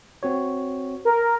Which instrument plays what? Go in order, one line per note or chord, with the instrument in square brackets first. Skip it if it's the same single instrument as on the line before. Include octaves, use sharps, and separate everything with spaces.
[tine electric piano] C4 F#4 C#5
[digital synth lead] A#4